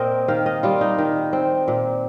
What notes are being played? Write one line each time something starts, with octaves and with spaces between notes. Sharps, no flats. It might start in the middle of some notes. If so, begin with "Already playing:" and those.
Already playing: A#2 C4 A#4 C5 D#5
D#3 F5
D#5
G3 F4
D#4
D#3
C4
A#2